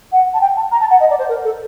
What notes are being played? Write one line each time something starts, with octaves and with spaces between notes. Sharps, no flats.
F#5
A5
G5
A5
A#5
A5
F#5
D#5
D5
C5
A#4
A4